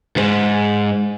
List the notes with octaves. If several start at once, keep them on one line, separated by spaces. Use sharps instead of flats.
D2 G#2